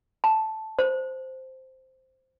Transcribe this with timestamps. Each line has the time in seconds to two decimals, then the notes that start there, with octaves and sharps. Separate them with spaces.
0.24 A5
0.79 C5